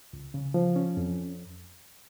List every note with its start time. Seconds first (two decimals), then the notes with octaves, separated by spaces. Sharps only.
0.13 C#2
0.34 C#3
0.54 F3
0.76 C#4
0.97 F2